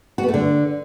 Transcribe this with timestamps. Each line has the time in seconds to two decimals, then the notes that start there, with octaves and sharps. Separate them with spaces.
0.18 F#4
0.23 B3
0.28 A3
0.34 D3